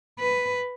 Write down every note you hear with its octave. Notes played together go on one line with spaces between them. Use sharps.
B4